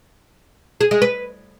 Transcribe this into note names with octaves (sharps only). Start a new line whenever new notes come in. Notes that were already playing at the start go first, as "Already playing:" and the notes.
G#4
G#3
B4